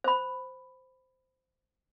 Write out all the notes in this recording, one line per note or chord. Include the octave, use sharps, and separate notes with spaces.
C5 B5